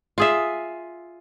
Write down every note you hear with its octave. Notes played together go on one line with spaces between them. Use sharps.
F4 G#4 E5